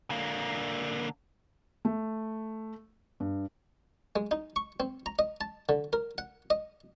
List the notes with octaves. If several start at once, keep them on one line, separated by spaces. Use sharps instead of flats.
D3 A#3
A3
G2
G#3
D#4
C#6
C4
A#5
D#5
A5
D3
A#4
F#5
D#5